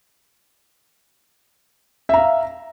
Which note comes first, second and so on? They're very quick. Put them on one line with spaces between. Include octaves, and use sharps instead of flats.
E5 A#5 F5